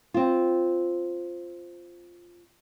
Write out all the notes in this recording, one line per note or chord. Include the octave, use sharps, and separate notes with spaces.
C4 F4